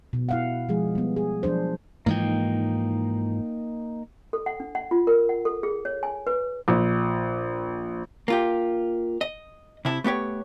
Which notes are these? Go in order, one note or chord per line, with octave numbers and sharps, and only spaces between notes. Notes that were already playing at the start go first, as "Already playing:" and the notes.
B2
E4 F5 F#5
F3 G#3 G#4
G3 B3
G#4
F3 F#3 D4 C5
G#2 E3 F3 A#3 D#4 G5
A4
F#5
D4
F#5
F4
A#4
F#5
A4
G#4
C#5
G#5
B4
A#1
A#3 F4 G4
D#5
C3 E4 A5
A3 B3 G4 C#5